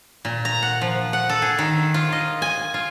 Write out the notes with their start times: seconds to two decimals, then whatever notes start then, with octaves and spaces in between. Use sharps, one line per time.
0.25 A#2
0.45 A#5
0.63 F#5
0.81 F3
1.13 F#5
1.29 A4
1.42 G#4
1.58 D#3
1.94 F4
2.12 D#5
2.42 G#5
2.74 F4